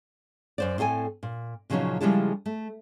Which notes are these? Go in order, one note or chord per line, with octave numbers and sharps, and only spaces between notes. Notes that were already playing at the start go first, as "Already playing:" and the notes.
F#2 C5 D5
A2 C4 A4 G5 G#5
A#2
A#2 C#3 F3 F#3 C#4 D#4
C#3 F3 G3 G#3 E4 A4
A3